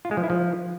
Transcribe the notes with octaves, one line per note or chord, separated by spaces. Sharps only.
F4
G#3
F3
E4
F3